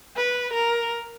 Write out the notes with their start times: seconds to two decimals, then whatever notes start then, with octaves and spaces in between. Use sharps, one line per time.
0.17 B4
0.53 A#4